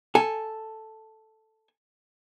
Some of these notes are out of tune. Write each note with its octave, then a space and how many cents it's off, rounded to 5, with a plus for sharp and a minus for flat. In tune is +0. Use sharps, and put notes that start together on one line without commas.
A4 +0 G#5 +0